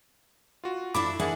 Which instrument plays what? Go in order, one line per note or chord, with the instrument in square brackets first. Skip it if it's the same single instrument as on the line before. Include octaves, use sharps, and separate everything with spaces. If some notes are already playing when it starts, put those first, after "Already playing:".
[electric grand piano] F4 F#4
[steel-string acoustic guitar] D4 E4 A4 [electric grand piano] B5 D6
[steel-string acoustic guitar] D4 E4 F#5 [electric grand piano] G#4 A#4